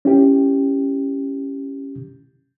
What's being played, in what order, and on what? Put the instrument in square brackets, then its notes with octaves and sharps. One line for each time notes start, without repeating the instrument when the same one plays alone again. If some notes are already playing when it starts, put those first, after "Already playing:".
[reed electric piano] C#4 E4 G4